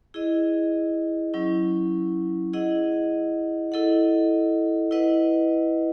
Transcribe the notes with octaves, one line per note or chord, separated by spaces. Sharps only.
E4 G#4 D#5
F#3 C#4 E4
E4 G#4 D#5 F#5
E4 A4 D#5 F#5
E4 B4 D#5 F#5